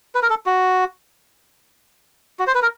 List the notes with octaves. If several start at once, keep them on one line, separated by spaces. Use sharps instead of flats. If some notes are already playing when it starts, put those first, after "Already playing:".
B4
A#4
A4
F#4
F#4
C5
B4
A#4